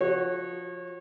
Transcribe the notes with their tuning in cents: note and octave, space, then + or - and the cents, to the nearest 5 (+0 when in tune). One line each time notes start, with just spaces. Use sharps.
F3 +5 F#4 +0 C#5 -35